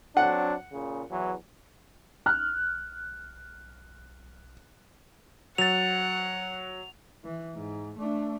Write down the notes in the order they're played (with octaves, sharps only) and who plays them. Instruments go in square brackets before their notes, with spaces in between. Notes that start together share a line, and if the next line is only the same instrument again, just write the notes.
[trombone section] F#3 C4 D4 [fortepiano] F#5
[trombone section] A#2 C#3
E2 E3 F#3
[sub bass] B1 [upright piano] F6 F#6
[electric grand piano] F#3 A6 [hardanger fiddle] F#5 [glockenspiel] F7
[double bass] E3
G#2
A3 D4